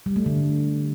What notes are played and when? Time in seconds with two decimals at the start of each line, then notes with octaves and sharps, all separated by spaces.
0.06 G3
0.16 A3
0.26 D3